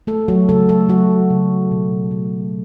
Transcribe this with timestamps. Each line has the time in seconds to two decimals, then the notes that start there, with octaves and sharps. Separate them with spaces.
0.07 A3 A4
0.28 F#3 F#4
0.49 C#3 A3 A4
0.69 A3 A4
0.89 F#3 F#4
1.30 C#3
1.71 B2
2.11 A3